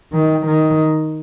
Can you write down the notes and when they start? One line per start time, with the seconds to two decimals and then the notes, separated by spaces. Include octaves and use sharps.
0.13 D#3
0.46 D#3